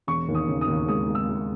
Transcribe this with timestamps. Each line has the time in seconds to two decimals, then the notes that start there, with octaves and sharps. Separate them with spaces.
0.07 E1 C#6
0.28 D#2
0.35 D#6
0.48 C#3
0.61 D#6
0.67 D#2
0.88 G#3 D#6
1.08 G#3
1.15 E6
1.29 G#3